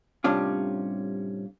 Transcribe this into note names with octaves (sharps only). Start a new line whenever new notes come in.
A2 C3 G3 C#4 D4 F4